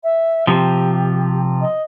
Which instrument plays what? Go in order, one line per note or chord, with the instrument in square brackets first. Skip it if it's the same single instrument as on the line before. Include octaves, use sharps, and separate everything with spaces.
[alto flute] E5
[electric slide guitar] C3 F3 [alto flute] G4
[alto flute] D#5